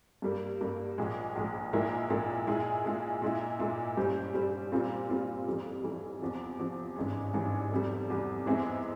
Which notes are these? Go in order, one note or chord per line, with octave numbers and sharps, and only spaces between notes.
G2 G3 A#3
G2 G3 A#3
A#1 A#2 G#3
A#1 A#2 G#3
A#1 A#2 G#3 E4 A#4
A#1 A#2 G#3 E4 A#4
A#2 G#3 E4 G#4
A#2 G#3 E4 G#4
A#2 G#3 E4
A#2 G#3 E4
G2 G3 C#4 G4 C5
G2 G3 C#4 G4 C5
A#2 G3 C4 F4
A#2 G3 C4 F4
F2 E3 G3
F2 E3 G3
E2 C3 F3
E2 C3 F3
G#1 G2 E3 G#3 C#4
G#1 G2 E3 G#3 C#4
F1 E2 C3 G3
F1 E2 C3 G3
E2 E3 G#3 C4 E4